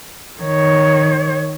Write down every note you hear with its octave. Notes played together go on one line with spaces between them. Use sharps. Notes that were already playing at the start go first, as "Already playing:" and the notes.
D#3 C#5